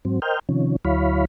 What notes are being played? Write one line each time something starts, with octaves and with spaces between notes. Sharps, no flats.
G#2 F#3 C4
A#4 C5 D#5 G5 F6 G6
C3 D#3 F3 C#4
D2 F#3 E4 C#5 F5 B5